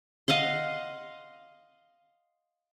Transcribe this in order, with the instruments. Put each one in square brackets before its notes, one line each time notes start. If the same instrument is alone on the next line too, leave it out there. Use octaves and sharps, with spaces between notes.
[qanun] D#5 F5 F#5 C6